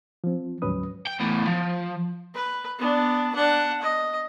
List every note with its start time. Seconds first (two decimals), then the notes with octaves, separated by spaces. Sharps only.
0.24 F3 C4
0.62 D2 G#2 F#3 C#4 B4 D#6
1.07 G5
1.20 E2 A2
1.47 F3
2.34 B4
2.79 B3 D4
3.35 D4 F#5
3.82 D#5